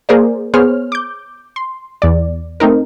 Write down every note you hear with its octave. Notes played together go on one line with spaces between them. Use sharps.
A#3 G#4 A#4 C5 D5
B3 G#4 C5 C#5 F6
D6 G6
C6
E2 D5
A3 C4 D#4 A#4